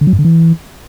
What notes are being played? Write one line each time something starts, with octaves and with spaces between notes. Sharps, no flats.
D3
F#3
G2
D3
E3